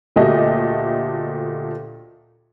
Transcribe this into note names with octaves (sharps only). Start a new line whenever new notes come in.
D2 A#2 A3 F#4 G4 D#5